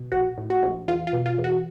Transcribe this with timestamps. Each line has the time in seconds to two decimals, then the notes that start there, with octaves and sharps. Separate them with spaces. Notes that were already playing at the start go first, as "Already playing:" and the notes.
Already playing: B2
0.12 A#1 F#4
0.38 A2
0.50 F#4
0.63 A#1
0.88 E2 F4
1.07 F4
1.13 B2
1.26 F4
1.38 E2
1.44 F#4